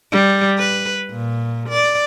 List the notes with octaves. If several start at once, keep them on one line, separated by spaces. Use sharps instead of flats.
G3
B4
A#2
D5